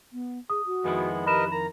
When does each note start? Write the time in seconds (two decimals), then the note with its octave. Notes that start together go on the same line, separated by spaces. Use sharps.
0.13 B3
0.50 G#4 D#6
0.66 F#4
0.84 F2 D#3 G#3 B3 E4
1.26 G4 A#4 B4 D#5 B5 E7
1.52 A#4 A#5